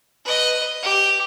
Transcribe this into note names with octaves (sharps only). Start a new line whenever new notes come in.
B4 D#5
G4